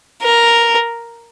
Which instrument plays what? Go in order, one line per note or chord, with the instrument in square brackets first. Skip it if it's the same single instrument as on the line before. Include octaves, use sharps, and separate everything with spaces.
[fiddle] A#4